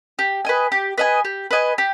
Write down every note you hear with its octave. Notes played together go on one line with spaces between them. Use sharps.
G4
B4 D#5 G#5
G4
B4 D#5 G#5
G4
B4 D#5 G#5
G4